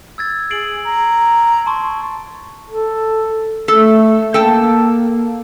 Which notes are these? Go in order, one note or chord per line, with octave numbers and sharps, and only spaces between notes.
E6 G#6 A6
G#4 C7 D7 F#7
A#5
A5 C6 C#6
A4
A3 A4
A#3 A4 G5 A5